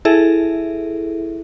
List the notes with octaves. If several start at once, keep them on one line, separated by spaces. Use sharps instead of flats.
E4 G#4 A4 E5